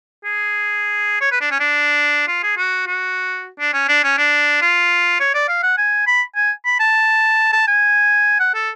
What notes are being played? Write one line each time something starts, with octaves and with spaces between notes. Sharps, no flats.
G#4
C#5
B4
D4
C#4
D4
F4
G#4
F#4
F#4
D4
C#4
D4
C#4
D4
F4
C#5
D5
F5
F#5
G#5
B5
G#5
B5
A5
A5
G#5
F#5
A4